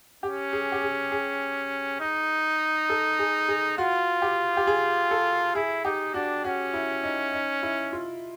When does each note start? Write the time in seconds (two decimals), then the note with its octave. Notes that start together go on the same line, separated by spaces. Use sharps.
0.23 C#4 G4
0.53 G#4
0.72 G4
0.82 G#4
1.12 G#4
2.01 D#4
2.90 A4
3.19 G#4
3.48 G#4
3.78 F4 F#4
4.22 G4
4.57 G4
4.67 G#4
5.11 A4
5.55 E4 G#4
5.85 D#4 G4
6.14 D4 F#4
6.44 C#4 F#4
6.74 E4
7.03 D#4
7.33 D#4
7.63 E4
7.93 F4